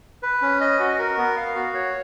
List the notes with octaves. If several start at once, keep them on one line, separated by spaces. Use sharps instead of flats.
B4
C#4
D#5
F#4
A#4
B3
F5
F#4
C#5